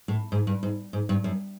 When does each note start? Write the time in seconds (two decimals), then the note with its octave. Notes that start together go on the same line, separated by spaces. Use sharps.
0.08 A2
0.32 G#2
0.47 G2
0.63 G#2
0.93 G#2
1.09 G2
1.24 F#2